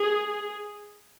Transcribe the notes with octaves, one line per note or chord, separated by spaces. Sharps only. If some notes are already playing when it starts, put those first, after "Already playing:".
Already playing: G#4